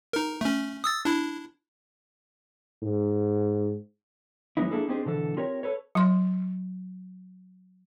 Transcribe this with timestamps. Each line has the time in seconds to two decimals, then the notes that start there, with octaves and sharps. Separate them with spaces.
0.13 D#4 A#4
0.41 A3 C#4
0.84 D#6 E6 A6
1.05 D4 E4
2.83 G#2
4.57 E2 F#3 G#3 B3 D#4 E4
4.71 A#3 D4 E4 G#4 A4
4.88 C4 D4 D#4 G4 G#4 C5
5.06 B2 D3 E3 A4
5.37 C4 F4 G4 A#4 C#5
5.63 A4 B4 C#5
5.95 F#3 C6